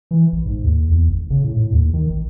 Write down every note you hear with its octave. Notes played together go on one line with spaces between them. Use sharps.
E3
A1
G#2
D#2
E2
G#1
C#3
A2
A2
D#2
D#3
A1